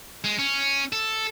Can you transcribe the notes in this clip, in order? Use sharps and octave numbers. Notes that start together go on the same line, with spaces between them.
G#3
C#4
A4